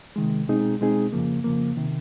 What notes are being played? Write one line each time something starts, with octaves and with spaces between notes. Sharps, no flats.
C3 D#3 G#3
B2 G#3 C4 D#4 G#4
B2 G#3 C4 D#4 G#4
F2 C#3 F3 A#3
F2 C#3 F3 A#3
C3 D#3